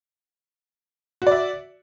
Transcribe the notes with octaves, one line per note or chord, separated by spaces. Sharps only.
F#4 D5 E5